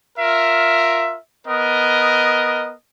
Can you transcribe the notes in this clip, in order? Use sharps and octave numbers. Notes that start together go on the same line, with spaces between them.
F4 A#4 E5
B3 A#4 D#5